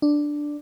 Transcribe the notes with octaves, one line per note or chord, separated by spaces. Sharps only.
D4